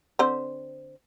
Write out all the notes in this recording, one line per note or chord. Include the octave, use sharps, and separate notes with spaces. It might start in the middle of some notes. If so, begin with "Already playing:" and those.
D3 C4 C5